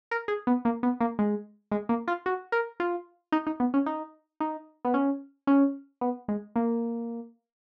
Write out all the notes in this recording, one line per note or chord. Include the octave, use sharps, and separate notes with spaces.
A#4
G#4
B3
A#3
B3
A#3
G#3
G#3
A#3
F4
F#4
A#4
F4
D#4
D#4
B3
C#4
D#4
D#4
B3
C#4
C#4
B3
G#3
A#3